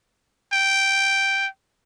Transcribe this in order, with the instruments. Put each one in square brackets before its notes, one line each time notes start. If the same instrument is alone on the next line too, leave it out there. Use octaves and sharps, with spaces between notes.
[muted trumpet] G5